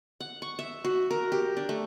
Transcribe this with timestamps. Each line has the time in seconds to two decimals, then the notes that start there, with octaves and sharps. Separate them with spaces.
0.20 F#5
0.42 C#6
0.59 E5
0.84 F#4
1.11 A#4
1.32 G4
1.57 D4
1.69 A3